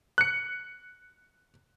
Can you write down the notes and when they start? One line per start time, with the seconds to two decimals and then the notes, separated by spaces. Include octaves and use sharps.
0.18 F#6 C#7